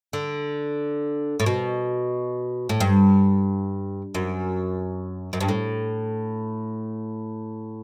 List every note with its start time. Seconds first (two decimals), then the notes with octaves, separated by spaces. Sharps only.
0.13 D3
1.40 A2
1.46 B2
2.69 A2
2.80 G2
4.15 F#2
5.33 F#2
5.40 G2
5.49 A2